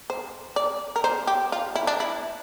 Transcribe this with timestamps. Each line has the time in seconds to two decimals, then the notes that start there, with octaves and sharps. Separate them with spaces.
0.10 C5
0.56 D5
0.96 A#4
1.04 C5
1.27 G4
1.52 F4
1.75 E4
1.87 D4
2.00 E4